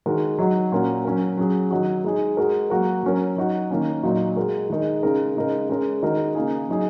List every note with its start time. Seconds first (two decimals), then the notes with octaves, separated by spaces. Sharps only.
0.06 D#3 G#3 F#4 A#4
0.38 F#3 D#4 F#4
0.72 A#2 A#3 C#4 F#4 A#4
1.05 F#3 C#4 A#4
1.37 F#3 C#4 G#4
1.71 D#3 F#3 D#4 F#4
2.04 G#3 D#4 G#4
2.37 G#3 F#4 A#4
2.70 F#3 A#3 F#4 A#4
3.03 F#3 C#4 A#4
3.36 F#3 D#4 F#4
3.71 D#3 A#3 C#4
4.03 A#2 F#3 D#4 F#4
4.36 G#3 F#4 A#4
4.70 D#3 G#3 D#4 A#4
5.03 C#3 G#3 D#4 A#4
5.36 C#3 G#3 D#4 A#4
5.69 G#3 C#4 A#4
6.03 D#3 G#3 D#4 F#4 A#4
6.35 C#3 A#3 D#4 G#4
6.69 F#3 D#4 G#4